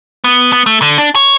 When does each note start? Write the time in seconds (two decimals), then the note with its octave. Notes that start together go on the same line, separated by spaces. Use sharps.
0.24 B3
0.53 B3
0.66 A3
0.82 D3
0.98 D4
1.15 C#5